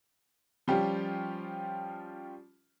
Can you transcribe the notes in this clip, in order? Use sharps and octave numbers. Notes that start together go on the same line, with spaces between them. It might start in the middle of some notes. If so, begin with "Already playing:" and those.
F3 G3 C#4 F4 G4